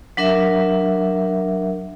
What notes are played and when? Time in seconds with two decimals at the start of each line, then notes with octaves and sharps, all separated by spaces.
0.17 F#3 D4 A#4 E5